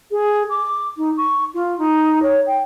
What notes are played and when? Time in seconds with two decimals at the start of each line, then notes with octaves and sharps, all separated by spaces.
0.11 G#4
0.49 D6
0.97 D#4
1.17 C#6
1.54 F4
1.78 D#4
2.22 C#5
2.46 G5